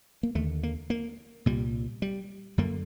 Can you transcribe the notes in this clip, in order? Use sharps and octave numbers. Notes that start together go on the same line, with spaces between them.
A#3
D#2 D3 A3
A#3
A#3
C2 A#2 G3
G3
F#2 D3 A#3